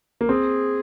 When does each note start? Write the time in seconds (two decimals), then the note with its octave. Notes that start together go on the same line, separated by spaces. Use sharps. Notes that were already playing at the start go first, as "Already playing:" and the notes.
0.21 A#3
0.29 C4 G#4